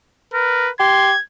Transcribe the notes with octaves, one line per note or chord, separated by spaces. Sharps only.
A#4 B4
G4 C6 G#6